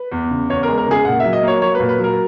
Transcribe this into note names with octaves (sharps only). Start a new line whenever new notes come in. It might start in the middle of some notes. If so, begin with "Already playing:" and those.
Already playing: B4
E2
C#3
E2 C#5
G#3 A#4
A#4
C#3 G#4
A#2 F#5
F#3 E5
D#5
A#3 C#5
F#3 C#5
B4
A#2
B4
F#3
A#4